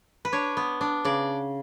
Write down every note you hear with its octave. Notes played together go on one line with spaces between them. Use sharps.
B4
D4 C#5
B3
D4
C#3 D5